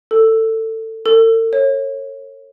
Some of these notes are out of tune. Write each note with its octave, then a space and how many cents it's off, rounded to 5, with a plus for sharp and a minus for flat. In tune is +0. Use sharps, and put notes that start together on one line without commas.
A4 +20
A4 +45
C#5 -25